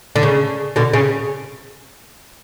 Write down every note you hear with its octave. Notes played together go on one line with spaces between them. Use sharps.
D3
C#3
B2 D3
C#3